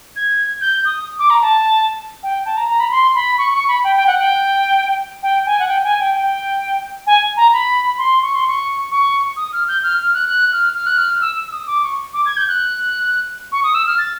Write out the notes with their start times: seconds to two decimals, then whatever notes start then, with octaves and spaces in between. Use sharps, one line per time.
0.16 G#6
0.61 G6
0.85 D#6
1.19 D6
1.30 A#5
1.42 A5
2.23 G5
2.46 A5
2.57 A#5
2.70 A#5
2.80 B5
2.91 C6
3.15 B5
3.38 C#6
3.54 C#6
3.68 B5
3.84 G5
3.96 G5
4.07 F#5
4.19 G5
5.23 G5
5.46 G#5
5.59 F#5
5.68 G5
5.84 G#5
6.00 G5
6.15 G5
7.07 G#5
7.37 A#5
7.53 B5
7.98 C6
8.22 C#6
8.35 C6
8.47 C#6
8.91 C#6
9.37 D#6
9.53 F6
9.68 G6
9.83 F6
9.99 F6
10.14 F#6
10.29 F#6
10.53 F6
10.75 F6
10.86 F#6
10.98 F6
11.21 E6
11.36 E6
11.52 D#6
11.67 D6
11.83 C#6
12.14 D6
12.26 G#6
12.37 G6
12.48 F#6
13.52 C#6
13.64 D#6
13.75 E6
13.87 F6
13.98 A6